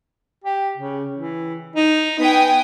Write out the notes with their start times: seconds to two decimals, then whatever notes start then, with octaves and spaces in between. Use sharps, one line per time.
0.44 G4
0.78 C#3
1.17 E3
1.76 D#4
2.19 B3 G5 G#5 D#6